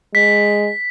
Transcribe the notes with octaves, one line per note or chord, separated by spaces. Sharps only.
G#3 B6